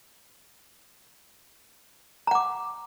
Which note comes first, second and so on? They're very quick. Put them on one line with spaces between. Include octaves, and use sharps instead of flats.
A#5 F#5 D6